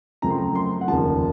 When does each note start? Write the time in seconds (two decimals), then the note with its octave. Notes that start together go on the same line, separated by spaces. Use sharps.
0.22 F#2 C#3 F3 A3 C4 A#5
0.30 C6
0.38 A#5
0.55 C6
0.81 F#5
0.88 F1 D#2 C#3 F3 A5